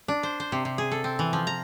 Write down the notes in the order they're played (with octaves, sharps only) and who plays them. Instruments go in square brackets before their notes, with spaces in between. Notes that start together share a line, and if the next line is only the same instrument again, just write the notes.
[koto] D4
C5
C5
C3
C3
G#4
A4
C4
E3
F3
A#5